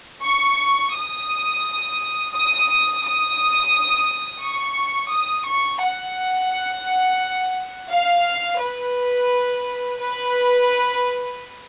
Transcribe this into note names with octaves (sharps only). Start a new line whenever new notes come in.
C#6
D#6
D#6
D#6
C#6
D#6
C#6
F#5
F5
B4
B4